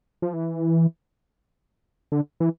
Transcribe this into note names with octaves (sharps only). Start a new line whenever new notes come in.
F3
E3
D3
E3